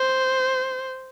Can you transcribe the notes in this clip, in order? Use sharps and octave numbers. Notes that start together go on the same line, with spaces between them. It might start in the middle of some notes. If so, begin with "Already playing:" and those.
Already playing: C5